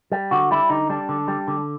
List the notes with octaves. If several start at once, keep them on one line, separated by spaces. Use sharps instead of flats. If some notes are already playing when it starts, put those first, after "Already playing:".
G3
D3 F#4
G3 E4
D3 D#4
G3 D4
D3
G3
D3